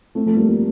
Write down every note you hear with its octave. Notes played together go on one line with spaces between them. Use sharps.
A3 C4
F3 A3
G3 A#3
A3 C4